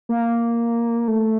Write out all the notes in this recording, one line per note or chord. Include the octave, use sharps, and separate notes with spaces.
A#3
A3